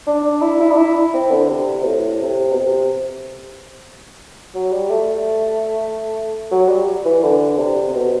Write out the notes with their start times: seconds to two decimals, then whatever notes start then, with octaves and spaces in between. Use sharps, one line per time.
0.07 D4
0.25 D4
0.42 E4
0.60 E4
0.72 D4
0.78 E4
1.14 C4
1.31 D3
1.50 C3
1.82 B2
1.86 A2
2.22 C3
2.52 B2
2.57 C3
4.55 F#3
4.72 G3
4.90 A3
6.51 F#3
6.69 G3
7.06 E3
7.23 D3
7.58 C3
7.89 C3
7.94 B2